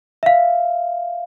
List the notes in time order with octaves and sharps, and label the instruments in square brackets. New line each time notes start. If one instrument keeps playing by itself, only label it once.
[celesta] E5 F5